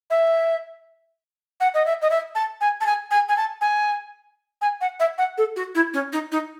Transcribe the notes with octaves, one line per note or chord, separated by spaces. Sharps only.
E5
F#5
D#5
E5
D#5
E5
A5
G#5
A5
G#5
G#5
G#5
A5
G#5
G#5
F#5
E5
F#5
A4
F#4
E4
C#4
D#4
D#4